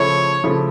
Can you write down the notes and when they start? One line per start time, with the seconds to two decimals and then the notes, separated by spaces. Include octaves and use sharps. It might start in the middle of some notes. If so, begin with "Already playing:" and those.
Already playing: C#3 F3 A3 E4 C#5
0.44 C#3 F3 A3 E4